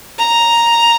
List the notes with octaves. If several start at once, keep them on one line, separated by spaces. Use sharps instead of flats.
A#5